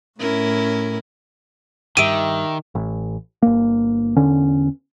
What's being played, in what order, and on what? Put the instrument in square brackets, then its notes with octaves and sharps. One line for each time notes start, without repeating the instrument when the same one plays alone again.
[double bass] A2 [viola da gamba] C#4 E4 A#4
[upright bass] G2 [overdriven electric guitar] D#3 [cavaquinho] G4 E5 [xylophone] D7 D#7
[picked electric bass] A1
G1 A#3
E2 D3 C#4